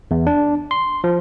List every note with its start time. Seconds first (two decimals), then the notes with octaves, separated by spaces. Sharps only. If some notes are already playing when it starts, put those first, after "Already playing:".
0.11 E2
0.27 D4
0.71 C6
1.04 F3